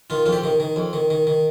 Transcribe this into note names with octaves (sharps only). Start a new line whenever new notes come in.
D#3 F4
F2 F4
G4
D#3
D#3
F2
D#3
D#3
D#3